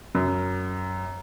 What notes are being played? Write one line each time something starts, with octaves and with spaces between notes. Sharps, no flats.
F#2